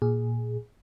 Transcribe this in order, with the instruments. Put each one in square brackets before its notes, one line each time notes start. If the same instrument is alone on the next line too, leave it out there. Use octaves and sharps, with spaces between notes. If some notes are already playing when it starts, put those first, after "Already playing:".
[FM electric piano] A#2 G#4